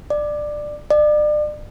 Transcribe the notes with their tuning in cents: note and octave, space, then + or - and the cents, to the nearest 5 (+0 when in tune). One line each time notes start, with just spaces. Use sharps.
D5 +15
D5 +35